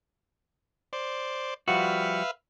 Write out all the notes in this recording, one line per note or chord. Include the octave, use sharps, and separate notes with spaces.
C5 D5
F3 G3 F#4 B4 E5 F5